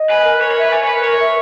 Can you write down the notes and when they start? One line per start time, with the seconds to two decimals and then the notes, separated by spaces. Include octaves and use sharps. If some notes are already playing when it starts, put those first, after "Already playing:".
Already playing: D#5
0.09 B4 G#5
0.25 A#4
0.41 A#4 C#5
0.51 C#5
0.56 B4 E5
0.71 C#5 G#5
0.84 C#5
0.87 A#4 B4
1.03 A#4 C#5
1.19 E5